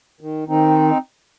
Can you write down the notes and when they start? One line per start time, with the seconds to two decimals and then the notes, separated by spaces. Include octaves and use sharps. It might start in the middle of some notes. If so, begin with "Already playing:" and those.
0.21 D#3
0.48 D#3 C4 D#4